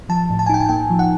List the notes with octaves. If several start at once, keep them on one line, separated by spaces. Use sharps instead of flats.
F3 A5
A2
A5
G#5
D#4 G5
G#5
A#3 G5
F3
F#5